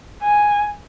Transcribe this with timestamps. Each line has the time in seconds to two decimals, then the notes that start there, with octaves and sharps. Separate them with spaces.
0.22 G#5